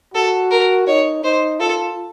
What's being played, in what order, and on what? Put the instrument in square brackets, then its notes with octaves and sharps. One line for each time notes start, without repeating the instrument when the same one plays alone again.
[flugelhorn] F#4 [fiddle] A4
[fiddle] A#4
[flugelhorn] D#4 [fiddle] C#5
[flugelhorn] D#4 [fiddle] C5
[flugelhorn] F4 [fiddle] A4